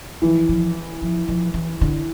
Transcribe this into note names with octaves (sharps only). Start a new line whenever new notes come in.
E3 F3
F3
F3
F3
E3
D3